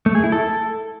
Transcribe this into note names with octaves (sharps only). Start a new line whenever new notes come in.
A3
G#4
E4
A4